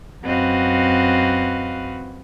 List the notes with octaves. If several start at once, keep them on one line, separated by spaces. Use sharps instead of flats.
F#2 C4 F#4 B4 D#5 F5